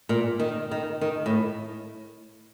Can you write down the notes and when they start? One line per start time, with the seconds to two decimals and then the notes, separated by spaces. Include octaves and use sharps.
0.09 A#2
0.40 D#3
0.71 D#3
1.01 D#3
1.26 A2